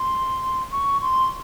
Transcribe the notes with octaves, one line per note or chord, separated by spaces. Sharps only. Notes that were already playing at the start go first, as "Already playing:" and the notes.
Already playing: C6
C#6
C6